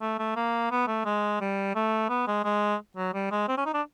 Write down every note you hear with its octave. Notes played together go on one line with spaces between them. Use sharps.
A3
A3
A#3
B3
A3
G#3
G3
A3
B3
G#3
G#3
F#3
G3
G#3
C4
C#4
D#4
D4